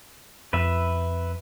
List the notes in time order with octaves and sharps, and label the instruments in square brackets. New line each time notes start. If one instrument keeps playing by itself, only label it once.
[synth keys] F2 [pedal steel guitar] B4 E5